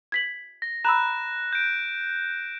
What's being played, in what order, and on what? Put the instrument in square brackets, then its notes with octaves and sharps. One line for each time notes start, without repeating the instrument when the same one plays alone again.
[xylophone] G#6 B6 F#7
[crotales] A#6
[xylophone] A#5 B5 E6 [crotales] F#6 E7
[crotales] G6 D7